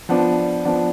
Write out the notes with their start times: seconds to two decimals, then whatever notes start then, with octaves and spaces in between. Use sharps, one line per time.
0.09 F3 B3 D4
0.65 F3 B3 D4